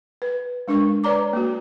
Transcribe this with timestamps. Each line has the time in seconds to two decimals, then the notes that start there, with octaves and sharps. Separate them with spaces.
0.22 B4
0.68 G#3 D4 A#4 C#6
1.04 B4 C#5 D5 A#5 D6
1.33 A#3 F#4